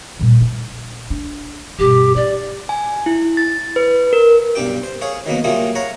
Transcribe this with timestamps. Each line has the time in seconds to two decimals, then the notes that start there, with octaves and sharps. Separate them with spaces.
0.20 A#2 G3
0.41 E4
1.10 D4
1.79 G2 B2 G4
2.15 D#4 D5
2.69 G#5
3.06 E4
3.37 A6
3.76 B4
4.13 A#4
4.55 B1 G2 D4 G4 G5
4.83 C5
5.01 G#4 C#5 F5
5.26 D#3 F#3 A#3 B3
5.44 F#3 G3 A3 A#3 F4 G#4
5.75 C#5 F5 F#5 A#5